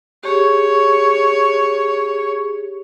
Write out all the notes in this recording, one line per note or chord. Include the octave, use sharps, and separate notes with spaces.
G4 G#4 C#5